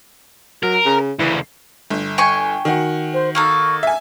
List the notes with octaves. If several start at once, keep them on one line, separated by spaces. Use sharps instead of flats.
F#3 A#4
C#3
D2 C#3 E3
G1
G5 G#5 C#6
D#3 F#4
C5
A#3 D#4 A4 C#6
E5 G#5